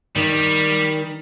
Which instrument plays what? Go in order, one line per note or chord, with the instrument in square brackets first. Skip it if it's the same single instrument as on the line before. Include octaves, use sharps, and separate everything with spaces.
[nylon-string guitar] D#3 [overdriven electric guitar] G3